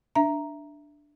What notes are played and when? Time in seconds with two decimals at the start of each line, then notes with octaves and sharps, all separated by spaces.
0.15 D4 E5 A#5